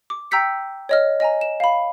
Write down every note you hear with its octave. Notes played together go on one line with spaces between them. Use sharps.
D6
G5 A#5 E6 G6 B6 C#7
C#5 D#5 F6
D#5 G#5 A#5
E7
F5 B5